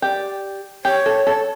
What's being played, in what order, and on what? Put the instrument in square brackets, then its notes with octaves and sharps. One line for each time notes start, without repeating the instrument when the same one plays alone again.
[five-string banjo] G4 [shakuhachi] D5
[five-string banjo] G4 [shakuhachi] C#5
[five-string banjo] A4
A4